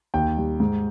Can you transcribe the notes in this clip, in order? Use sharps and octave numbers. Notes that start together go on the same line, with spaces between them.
D#2 G5
G3
G#2